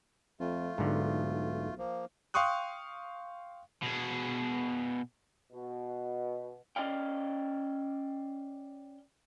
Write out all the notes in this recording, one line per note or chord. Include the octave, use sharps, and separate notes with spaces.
F2 A3 F4
B1 G#2 D3
F3 A#3
F5 G5 C6 C#6 D#6 F#6
B2 G#4
B2
C#4 D5 D#5 F5 G5